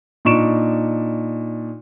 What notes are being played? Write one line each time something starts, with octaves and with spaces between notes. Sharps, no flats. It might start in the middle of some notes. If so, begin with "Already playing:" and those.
A#2 D4 D#4 C#6 D7 E7